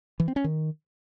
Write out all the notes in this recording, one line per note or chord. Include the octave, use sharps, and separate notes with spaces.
E3
C4
C#4
D#3